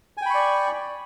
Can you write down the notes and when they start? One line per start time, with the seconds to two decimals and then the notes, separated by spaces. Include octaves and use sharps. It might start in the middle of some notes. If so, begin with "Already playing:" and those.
0.17 G#5
0.22 G5
0.26 B5
0.30 C#6
0.34 D5